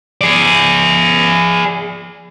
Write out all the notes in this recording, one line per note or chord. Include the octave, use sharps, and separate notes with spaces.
G#4 D5